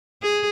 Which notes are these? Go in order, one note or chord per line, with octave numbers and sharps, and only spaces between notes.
G#4